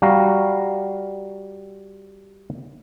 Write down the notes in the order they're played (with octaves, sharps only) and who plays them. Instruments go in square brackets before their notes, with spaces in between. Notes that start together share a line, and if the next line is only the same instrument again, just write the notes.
[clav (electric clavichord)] G3 F#4 F5 A#5